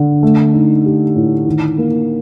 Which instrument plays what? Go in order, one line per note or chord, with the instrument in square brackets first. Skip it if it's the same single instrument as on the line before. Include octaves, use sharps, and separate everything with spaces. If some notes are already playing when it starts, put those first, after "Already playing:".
Already playing: [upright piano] D3
A3
D#4
G4
A2
D#3
A#3